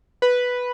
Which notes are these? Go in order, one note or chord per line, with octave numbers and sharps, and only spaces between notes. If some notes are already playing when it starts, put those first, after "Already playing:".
B4